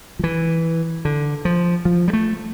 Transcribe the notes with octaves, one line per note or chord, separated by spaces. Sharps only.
F3
E3
D3
F3
F3
G3
A3